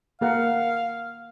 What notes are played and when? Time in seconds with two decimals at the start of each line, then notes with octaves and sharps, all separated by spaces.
0.21 A#3 A#4 F5 F#5